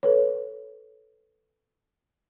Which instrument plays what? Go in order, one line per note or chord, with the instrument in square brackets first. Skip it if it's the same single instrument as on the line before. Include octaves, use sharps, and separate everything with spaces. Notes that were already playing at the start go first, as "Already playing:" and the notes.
[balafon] A4 B4 C#5